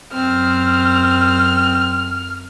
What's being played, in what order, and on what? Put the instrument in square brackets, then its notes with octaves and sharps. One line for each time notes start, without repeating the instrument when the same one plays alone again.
[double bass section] F#2 [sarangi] C4 [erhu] F6